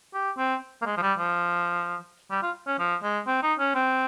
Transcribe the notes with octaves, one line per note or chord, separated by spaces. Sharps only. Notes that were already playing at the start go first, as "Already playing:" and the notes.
G4
C4
A#3
G#3
F3
G3
F3
G3
F4
C#4
F3
G#3
C4
D#4
C#4
C4